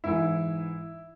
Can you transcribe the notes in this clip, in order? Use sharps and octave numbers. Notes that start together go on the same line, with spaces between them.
G#2 E3 E4